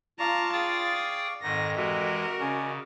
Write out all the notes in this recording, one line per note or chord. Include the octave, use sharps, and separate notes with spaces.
F4 D5 F5 A5 A#5 C#6
G#4 G5 D#6 A6
F2 G#2 D#3 D#4 F#5 A#6
E3 G#3 F#4 G4 A#4 E5
C#3 C#4 D5 D#5 G#5